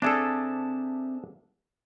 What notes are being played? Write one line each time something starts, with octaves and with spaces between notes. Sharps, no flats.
C4 D4 G#4 A4 E5